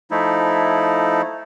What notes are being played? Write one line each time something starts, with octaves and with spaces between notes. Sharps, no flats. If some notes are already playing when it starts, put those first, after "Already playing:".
F3 A3 D#4 E4